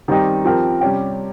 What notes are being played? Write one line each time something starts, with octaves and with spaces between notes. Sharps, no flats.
D#3 G3 C4 D#4 G4
F3 C4 G4 A#4
C3 G3 C#4 G4